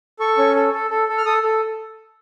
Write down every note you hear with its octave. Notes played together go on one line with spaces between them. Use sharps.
A4 C#6
C#4
A4
A4
A4
A4
F6
A4 D#6
A4